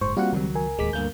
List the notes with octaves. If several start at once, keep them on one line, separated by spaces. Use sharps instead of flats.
F#1 G#2 C5 C#6
G3 A#3 C4 F4 F#4 F#5
C#2 D#3 F3 F#3
A#4 G#5
D1 D#2 G#3 D6 B6
D2 G2 A#3 G6